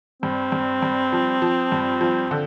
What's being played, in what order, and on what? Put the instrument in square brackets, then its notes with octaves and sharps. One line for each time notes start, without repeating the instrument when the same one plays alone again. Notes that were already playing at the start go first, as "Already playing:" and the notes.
[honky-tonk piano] G2 [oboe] C4
[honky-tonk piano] G2
G2
F3
F3
G2
F3
D3